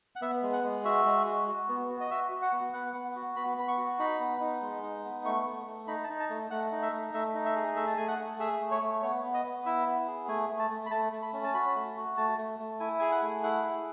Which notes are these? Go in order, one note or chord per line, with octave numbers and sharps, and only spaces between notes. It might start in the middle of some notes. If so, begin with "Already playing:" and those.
F#5
B3 E5
G#3
F#5
G#3
F#4 E5
G#3
F#4
F#4
B3
F#4
D#5
F#4 E5
F#4
F#5
B3
B3 F#5
B3
F#4
B3 B5
B3 B5
C#6
F#4
D#4 B5
B3
D#4
G#3
D#4
B3
A3 C#6
A3
A3
D#4 B5
A5
D#4
A5
A3
A3 F#5
D#4
E5
A3
A3 E5
D#4
E5
G#4
A3 E5
A5
A3 G#5
F#5
A3
G#4 E5
A3
C#5
A3
B3 C#5
B3
D#5
B3
E4 E5
B3
G#4
A3 G#5
A3
A5
A3
B5
A3 A5
A3
B5
C#4
A5
F#4 B5
A3
F#4
A3 A5
A3
A3
E4 G#5
G#4 G#5
F#5
A3
E4 F#5
G#4